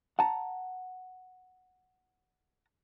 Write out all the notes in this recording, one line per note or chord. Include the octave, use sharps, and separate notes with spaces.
F#5 A5 A#5